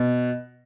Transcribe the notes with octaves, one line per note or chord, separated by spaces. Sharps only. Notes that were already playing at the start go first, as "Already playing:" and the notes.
Already playing: B2